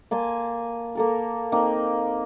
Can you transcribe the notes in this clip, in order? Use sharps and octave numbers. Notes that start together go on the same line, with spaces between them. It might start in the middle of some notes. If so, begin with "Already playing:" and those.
A#3 G#5 A5 C6
A#3 A4 A#4
A#3 C4 D#4